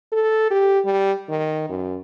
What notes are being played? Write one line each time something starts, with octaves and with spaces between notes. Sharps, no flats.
A4
G4
G3
D#3
F#2